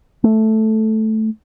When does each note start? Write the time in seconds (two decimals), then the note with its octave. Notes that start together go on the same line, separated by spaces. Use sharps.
0.24 A3